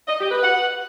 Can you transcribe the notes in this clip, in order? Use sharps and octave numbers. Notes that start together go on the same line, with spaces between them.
D#5
G4
B4
F#5